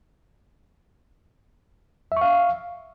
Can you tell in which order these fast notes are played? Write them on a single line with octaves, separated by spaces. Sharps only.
E5 C#6 F5